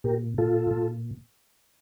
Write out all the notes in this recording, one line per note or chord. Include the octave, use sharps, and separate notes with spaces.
A#2 G4 A#4
A#2 F4 A4
A#2